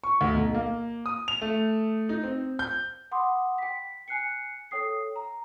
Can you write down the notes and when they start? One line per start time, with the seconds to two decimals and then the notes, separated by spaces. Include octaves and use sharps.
0.04 C#6
0.21 D2
0.34 B1
0.54 A#3
1.06 D#6
1.28 F7
1.42 A3
2.09 D#4
2.24 C4
2.59 G6
3.11 F#5 B5 C6 D6 D#6
3.58 G5 B6
4.08 G#5 F#6 C7 C#7
4.71 A4 C#5 G5 D#6 C7
5.16 A#5